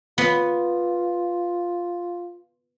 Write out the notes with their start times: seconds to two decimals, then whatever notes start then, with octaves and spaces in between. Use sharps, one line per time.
0.18 B3 F4